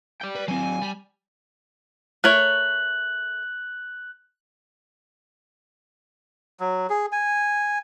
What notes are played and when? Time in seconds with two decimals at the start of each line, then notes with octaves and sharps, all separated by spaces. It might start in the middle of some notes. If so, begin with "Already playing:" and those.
0.22 D5 G5
0.36 B4
0.48 F#3 C4 G#5
0.82 G3
2.24 A3 A#4 C#5 F#6 F#7
6.60 F#3
6.90 G#4
7.12 G#5